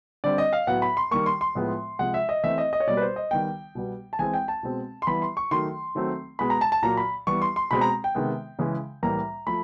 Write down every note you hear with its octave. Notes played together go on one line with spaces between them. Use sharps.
D3 G3 C4 D5
D#5
F5
A2 F#3 B3 F#5
B5
C6
D#3 G3 A#3 C#6
C6
C6
A2 F3 G#3 B3
C3 F3 G#3 F#5
E5
D#5
E3 A3 C4 E5
D#5
D#5
C#5
B2 G3 A#3 D5
B4
C5
D#5
D#3 G3 B3 G5
B2 G3 B3
A5
E3 G#3 C4 G#5
G5
A5
B2 G#3 C4
C6
E3 G3 B3 B5
C6
C#6
D#3 F#3 A3 C6
D#3 F#3 A3 C4
B2 G#3 B3 B5
A#5
A5
A5
A#2 F#3 A#3 A#5
B5
E3 G3 B3 C#6
C6
C6
B2 G#3 C4 B5
A#5
G5
C3 D#3 G#3 B3
C#3 E3 G#3
A2 E3 G3 A#3 A#5
F3 A3 B5